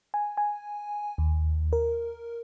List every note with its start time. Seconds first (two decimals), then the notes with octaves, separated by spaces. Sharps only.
0.14 G#5
0.37 G#5
1.18 D#2
1.73 A#4